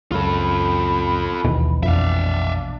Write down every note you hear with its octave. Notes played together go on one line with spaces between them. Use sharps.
C#2 F#2 F4 A4 B5
A#1 D#2 B2 E3
F2 D4 E5 F5